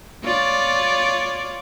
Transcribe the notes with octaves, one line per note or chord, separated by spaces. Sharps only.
F4 C#5 D5